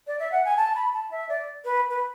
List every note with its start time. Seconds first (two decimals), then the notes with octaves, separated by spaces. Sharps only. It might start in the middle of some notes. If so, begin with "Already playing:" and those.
0.07 D5
0.19 E5
0.31 F#5
0.44 G#5
0.56 A5
0.75 B5
0.92 A5
1.10 E5
1.28 D5
1.64 B4
1.90 B4